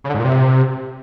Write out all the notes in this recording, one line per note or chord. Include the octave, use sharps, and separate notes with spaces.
C#3
D3
G#2
A#2
C3